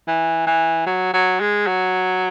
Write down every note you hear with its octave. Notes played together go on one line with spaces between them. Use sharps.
E3
E3
F#3
F#3
G#3
F#3